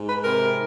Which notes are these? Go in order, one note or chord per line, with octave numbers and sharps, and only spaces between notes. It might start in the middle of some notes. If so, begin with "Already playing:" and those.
Already playing: G#2
B4
C3 A#4